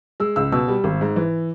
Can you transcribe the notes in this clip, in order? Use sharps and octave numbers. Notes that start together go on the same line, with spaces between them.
G#3 E6
C#2 E6
B2 E6
G3
G#1
G#2
E3